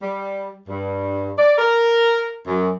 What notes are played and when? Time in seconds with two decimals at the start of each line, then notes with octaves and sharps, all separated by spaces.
0.01 G3
0.68 G2
1.37 D5
1.58 A#4
2.47 F#2